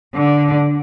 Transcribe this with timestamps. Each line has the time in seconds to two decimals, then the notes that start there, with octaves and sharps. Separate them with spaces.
0.15 D3